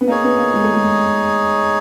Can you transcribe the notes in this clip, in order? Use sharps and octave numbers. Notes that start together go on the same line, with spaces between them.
B3
A#3 D#4 G#4 C#5
B3
A#3
G#3
A3
G#3